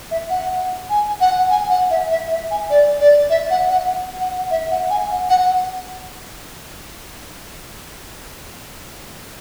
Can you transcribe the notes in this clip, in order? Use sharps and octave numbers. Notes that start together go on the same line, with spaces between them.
E5
F#5
G#5
F#5
G#5
F#5
E5
E5
E5
G#5
D5
D5
E5
F#5
F#5
F#5
E5
F#5
G#5
F#5
F#5